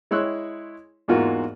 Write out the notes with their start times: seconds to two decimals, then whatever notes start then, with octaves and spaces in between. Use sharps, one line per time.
0.11 G#3 E4 C#5 C6 E6 F#6
1.08 E2 G#2 E3 A#3 F4 F#4